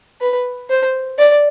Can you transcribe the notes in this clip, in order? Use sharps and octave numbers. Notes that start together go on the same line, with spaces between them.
B4
C5
D5